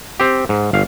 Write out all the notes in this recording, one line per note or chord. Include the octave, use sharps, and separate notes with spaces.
C4 G4
G#2
G1 F5